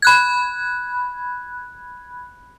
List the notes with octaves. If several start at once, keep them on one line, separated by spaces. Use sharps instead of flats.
B5 F#6 G#6